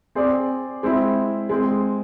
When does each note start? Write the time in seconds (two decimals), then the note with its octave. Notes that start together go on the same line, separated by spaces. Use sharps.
0.15 C4 G#4 D5
0.83 G#3 C4 E4
1.49 G#3 C4 G#4